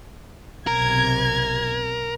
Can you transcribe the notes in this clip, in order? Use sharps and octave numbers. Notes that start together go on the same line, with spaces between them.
B1 C3 A#4 G#6